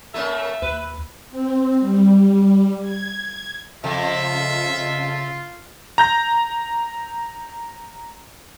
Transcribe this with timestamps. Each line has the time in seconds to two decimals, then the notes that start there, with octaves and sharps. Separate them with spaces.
0.14 A3 A#3 C#4 E5
0.62 D#2 B4
1.30 C4
1.79 G3
2.81 G#6
3.84 F2 C#3 F4 E5
5.98 A#5 G6 A#6